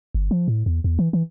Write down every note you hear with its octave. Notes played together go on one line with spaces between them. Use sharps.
G1
F3
A2
E2
E2
E3
E3